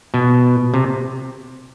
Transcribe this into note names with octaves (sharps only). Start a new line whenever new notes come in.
B2
C3